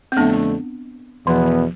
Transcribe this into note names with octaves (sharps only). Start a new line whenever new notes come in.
C4
F2 D3 A3 B3 D4
E2 B2 F3 B3